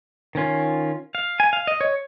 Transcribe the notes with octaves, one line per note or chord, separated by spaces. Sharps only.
D#3 C#4 F4
F5
G#5
F5
D#5
C#5